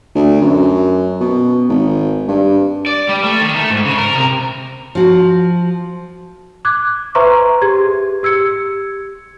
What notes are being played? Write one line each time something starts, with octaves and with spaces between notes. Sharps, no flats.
D2
F#2
B2
G#1
G2
D5
G3
A3
D#3
A3
G#2
C#3
A#4
C3
F3 F#4
D6 F#6 G#6
B4 C5 E5 A#5 C6 C#6
G4 G#4 G#6
G4 E6 G#6 C#7